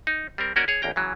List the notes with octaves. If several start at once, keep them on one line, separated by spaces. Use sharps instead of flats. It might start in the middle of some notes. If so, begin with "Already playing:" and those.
D#4
G3 C4 A#4
A#3 C#4 F#4 A#4 D5 D#5
G#4 C#5
A1 E2 A#3 G5 A#5
C#3 E3 F#3